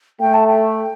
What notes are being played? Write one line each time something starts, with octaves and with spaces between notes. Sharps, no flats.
A3 G5
A5
G5